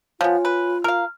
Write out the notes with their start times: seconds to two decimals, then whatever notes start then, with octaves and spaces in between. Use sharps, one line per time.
0.21 F3 B3 F4 C#5 G#5
0.45 B4
0.84 A#4 F5 F6